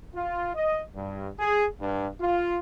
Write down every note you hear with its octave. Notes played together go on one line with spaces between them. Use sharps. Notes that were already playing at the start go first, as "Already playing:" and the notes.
F4
D#5
G2
G#4
G2
F4